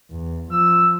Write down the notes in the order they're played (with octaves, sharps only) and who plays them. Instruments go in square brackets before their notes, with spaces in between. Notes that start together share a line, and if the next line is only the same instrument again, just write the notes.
[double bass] E2
[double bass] F3 [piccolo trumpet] E6